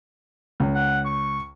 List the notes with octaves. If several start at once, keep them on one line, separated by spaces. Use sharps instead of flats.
C#2
F#5
C#6